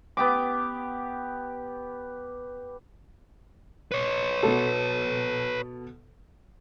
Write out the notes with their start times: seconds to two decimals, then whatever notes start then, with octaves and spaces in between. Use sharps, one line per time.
0.17 B3 G4 D6
3.92 B4 C#5
4.43 B2 B3 A4